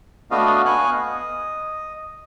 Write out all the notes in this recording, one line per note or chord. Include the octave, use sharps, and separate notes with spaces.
A3 B3 D4 F#4 D#5 F5
B3 F5 G#5 C#6 F#6
D#5